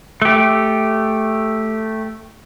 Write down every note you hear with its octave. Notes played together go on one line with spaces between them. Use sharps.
A3 G4